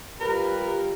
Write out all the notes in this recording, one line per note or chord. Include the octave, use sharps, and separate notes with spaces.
G3 F4 G4 A#4 B4